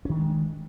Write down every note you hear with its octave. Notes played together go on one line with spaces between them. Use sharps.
D#3 G#3 C#4 D4